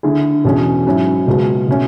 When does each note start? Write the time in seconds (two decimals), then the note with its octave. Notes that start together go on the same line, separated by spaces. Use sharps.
0.03 D3 A3 E4 G#4
0.44 E2 B2 A3 C#4 G#4
0.86 G#2 F#3 C#4 E4
1.26 C#2 B2 G#3 B3 F#4
1.68 B2 A3 C#4